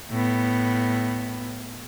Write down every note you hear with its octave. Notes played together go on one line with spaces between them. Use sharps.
A2 B3